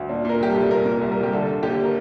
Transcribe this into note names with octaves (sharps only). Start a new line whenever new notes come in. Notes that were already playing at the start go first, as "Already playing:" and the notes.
Already playing: D2
A#2 D4
A#2 A#4
C2 G4
A4
C2
A#2 A#4
A#2
A#4
C2
A#4
C2
G4
D3 A4
D3
D#2 G4
A#4